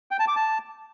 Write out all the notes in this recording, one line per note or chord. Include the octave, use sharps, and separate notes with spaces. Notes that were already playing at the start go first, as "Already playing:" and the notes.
G5
A5
D6
A5